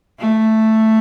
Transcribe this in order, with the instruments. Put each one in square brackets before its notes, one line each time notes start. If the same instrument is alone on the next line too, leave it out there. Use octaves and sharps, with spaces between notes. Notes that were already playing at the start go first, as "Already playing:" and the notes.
[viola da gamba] A3